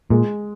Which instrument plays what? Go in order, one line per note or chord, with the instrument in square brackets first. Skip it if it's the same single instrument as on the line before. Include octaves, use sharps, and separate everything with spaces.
[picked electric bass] A#2 [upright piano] G#3